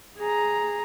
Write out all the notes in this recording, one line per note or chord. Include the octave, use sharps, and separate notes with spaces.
G#4 A#5